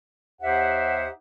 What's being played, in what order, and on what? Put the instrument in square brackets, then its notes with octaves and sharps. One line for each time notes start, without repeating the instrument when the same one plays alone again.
[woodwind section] D#2 D#4 G4 C5 E5 F#5